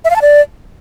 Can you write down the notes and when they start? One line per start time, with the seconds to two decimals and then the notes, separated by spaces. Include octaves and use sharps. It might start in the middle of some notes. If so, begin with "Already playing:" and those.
0.05 E5
0.10 F5
0.16 A5
0.22 D5